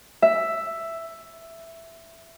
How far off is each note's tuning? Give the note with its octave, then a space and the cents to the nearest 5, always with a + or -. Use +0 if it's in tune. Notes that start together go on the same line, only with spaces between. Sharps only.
E5 +5